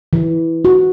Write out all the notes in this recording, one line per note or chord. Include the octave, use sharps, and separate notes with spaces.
E3
F#4